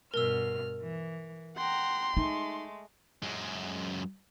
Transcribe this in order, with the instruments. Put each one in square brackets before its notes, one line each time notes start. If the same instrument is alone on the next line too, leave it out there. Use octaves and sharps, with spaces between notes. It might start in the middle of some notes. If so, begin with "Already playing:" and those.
[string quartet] G2 B2 F6 [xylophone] A#4 E6
[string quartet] E3
[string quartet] F#5 G5 A#5 [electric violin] C6
[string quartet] G#3 A3 [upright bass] D#4
[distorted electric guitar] F#2 G#3